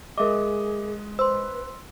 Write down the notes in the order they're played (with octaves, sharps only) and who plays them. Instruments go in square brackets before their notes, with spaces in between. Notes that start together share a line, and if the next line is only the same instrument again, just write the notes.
[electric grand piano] G#3 D#5 [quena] G#4 [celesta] A#4 E5 D6
[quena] B4 [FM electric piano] C5 [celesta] C6 E6